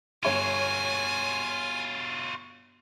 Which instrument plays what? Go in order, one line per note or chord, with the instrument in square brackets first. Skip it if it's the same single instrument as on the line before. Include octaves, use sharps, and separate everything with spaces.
[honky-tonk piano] G1 C#5 E7 [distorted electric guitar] F4 F#4 [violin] G#5